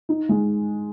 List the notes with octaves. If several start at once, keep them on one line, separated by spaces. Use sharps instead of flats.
D#4
G#3